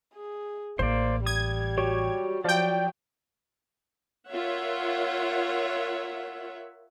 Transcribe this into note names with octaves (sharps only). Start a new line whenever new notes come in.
G#4
A1 A#3 C5 D5
G3 D#6 G#6
F#4 G4 C#5
F3 F#3 D5 G5
F4 A#4 C#5 E5 F#5